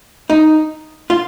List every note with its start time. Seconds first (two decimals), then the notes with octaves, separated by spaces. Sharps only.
0.30 D#4
1.10 F4